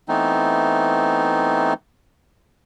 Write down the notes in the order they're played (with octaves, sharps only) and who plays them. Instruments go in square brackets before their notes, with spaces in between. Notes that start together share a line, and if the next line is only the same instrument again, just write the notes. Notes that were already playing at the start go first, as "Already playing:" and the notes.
[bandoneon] E3 A3 B3 C4 D#4